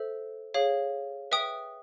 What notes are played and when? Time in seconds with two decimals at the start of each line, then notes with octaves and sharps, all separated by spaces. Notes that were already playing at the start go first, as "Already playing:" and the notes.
Already playing: A4 C5 E5
0.54 G#4 C#5 F5
1.32 B4 E5 G5 D#6